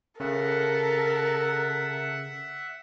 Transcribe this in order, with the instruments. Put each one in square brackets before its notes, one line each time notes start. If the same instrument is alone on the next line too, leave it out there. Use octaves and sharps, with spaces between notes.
[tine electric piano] C#3 [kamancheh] A4 A#4 [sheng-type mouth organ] E5 F#5